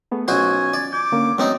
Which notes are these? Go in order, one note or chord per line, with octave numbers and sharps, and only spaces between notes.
A3 B3 G#4
B1 C#4 F4 F#4 C5 G#5
D5
D6 G6
D3 A#3 C#4
F#2 G#3 B3 C4 D#4